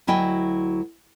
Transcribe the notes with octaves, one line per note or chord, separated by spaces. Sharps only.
D2 F#3 E4 D#5 G5 G#5